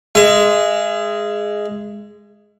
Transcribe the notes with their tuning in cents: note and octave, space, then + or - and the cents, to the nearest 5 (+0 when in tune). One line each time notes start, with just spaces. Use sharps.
G#3 +0 E5 +40